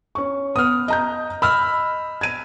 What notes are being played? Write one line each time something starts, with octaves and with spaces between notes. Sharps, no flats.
C#4 C#6
B3 D#6 F6
D#5 A#5 G6
D#5 B5 E6 F6
G#6 D#7